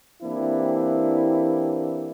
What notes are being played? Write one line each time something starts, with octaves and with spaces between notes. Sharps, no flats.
E3 A#3 C4 D4 E4 G4